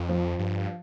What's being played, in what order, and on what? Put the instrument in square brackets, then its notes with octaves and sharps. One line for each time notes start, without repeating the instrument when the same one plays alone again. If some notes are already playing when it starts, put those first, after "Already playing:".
Already playing: [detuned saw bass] F2
[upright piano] F3
[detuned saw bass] G2